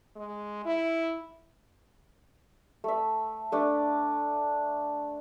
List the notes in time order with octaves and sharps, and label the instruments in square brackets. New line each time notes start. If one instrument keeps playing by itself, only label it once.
[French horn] G#3
E4
[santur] A3 E5
A3 D4